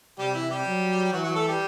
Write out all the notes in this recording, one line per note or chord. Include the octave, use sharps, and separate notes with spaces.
C3 G3 G4
E3 E4
G3 G4
F#3
G4
E3 F#3 F#4
F#3 F#4
A3 A4
G3 G4